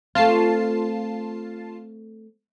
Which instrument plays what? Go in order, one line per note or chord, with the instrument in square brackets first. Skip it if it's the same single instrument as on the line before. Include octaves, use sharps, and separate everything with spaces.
[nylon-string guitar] A3 C4 [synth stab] F4 A5 C7